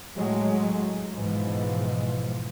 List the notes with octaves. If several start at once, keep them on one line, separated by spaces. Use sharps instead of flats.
A2 F#3 G#3
G#2 B2 E3 F3